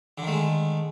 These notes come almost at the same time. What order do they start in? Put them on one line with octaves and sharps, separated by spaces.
D3 D#3 A3 G#3